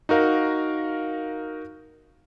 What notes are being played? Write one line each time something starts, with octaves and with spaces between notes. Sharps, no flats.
D#4 F#4 A#4 F5